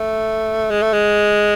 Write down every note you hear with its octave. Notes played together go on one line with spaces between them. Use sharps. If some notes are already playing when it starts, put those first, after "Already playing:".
Already playing: A3
G#3
A3
G#3